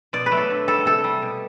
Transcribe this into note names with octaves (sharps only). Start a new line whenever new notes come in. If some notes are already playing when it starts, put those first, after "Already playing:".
B2 D5
B4
F#3 A3
A4
D3
G3 A4
C3 A4
G3
B2